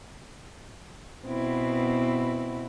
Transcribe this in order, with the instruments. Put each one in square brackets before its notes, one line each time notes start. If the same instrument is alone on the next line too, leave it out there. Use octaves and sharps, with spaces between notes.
[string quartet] B2 B3 C4 E4